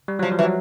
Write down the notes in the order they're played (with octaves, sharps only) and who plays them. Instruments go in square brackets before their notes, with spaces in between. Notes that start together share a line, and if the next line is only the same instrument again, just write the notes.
[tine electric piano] G3
[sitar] F3 [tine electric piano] F#3
[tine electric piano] F3
[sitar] E3
[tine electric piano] F#3